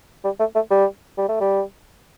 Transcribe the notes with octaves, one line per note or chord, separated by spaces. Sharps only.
G3
A3
A3
G3
G3
A3
G3